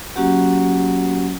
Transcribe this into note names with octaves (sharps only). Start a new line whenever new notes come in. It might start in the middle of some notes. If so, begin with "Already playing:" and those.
F#3 A#3 C#4 F#4 G4 F#5